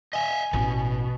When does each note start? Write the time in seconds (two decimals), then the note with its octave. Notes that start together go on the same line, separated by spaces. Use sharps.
0.13 D#5 E5 G#5
0.53 A1 B2